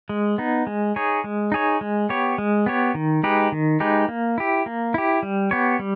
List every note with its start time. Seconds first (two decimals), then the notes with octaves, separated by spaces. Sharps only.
0.09 G#3
0.38 B3 D#4
0.67 G#3
0.96 D#4 G#4 C#5
1.24 G#3
1.52 D#4 G#4 C#5
1.81 G#3
2.09 B3 G4 C#5
2.38 G#3
2.66 B3 G4 C#5
2.95 D#3
3.23 G#3 D#4 G4 B4
3.52 D#3
3.80 G#3 D#4 G4 B4
4.09 A#3
4.38 E4 G4
4.66 A#3
4.94 E4 G4
5.23 G3
5.51 B3 G4 C#5
5.79 G3